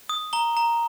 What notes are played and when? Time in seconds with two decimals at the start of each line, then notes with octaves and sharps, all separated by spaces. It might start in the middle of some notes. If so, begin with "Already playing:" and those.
0.09 D#6
0.33 A#5 G7
0.57 A#5